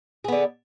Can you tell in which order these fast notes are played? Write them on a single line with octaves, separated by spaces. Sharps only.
G#4 B3 D3